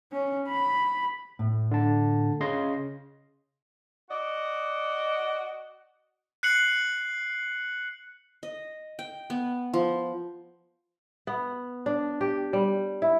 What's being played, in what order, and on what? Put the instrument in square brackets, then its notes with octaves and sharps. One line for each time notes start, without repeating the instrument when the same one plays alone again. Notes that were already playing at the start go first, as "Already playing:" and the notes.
[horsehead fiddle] C#4
B5
[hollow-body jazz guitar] A2
[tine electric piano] D3 A5
C#3 D#5 C6
[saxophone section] F#4 D5 D#5
[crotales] F#6 C7 C#7 F#7
[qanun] D#5
G5
B3
F3
[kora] B3
D4
G4
G3
E4